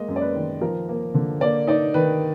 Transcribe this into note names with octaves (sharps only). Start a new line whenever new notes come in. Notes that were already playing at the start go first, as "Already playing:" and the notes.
Already playing: G#3 A#3 D#5
F#2
D5
B4
D#3
F3 A#4
A#3
D3
A#3 D5
D#4 D5
D#3 B4